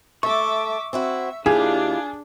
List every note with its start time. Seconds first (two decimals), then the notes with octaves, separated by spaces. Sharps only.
0.23 A3 A4 E5 C#6 D6
0.93 C4 E4 F#4 E5
1.46 D#2 D4 E4 F4 G4 G#4